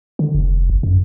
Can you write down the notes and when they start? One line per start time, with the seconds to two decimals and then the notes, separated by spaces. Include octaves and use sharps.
0.19 D3
0.35 F1
0.70 G1
0.83 F#2